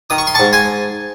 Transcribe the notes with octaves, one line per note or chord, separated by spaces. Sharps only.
D#3 D#6
C#6
C6
G#2 A5 C#6
G#5 C6